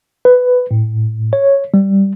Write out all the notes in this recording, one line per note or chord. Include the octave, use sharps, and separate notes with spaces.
B4
A2
C#5
G3